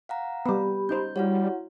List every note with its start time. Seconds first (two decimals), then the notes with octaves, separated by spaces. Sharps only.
0.09 F5 F#5 A#5
0.46 G3 B3 G4 B5
0.89 C#4 D#4 C5 G6
1.16 G3 E4 F#4 C#5 F#5